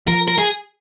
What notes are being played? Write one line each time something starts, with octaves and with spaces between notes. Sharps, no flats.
F3 A#4
A#4
G#4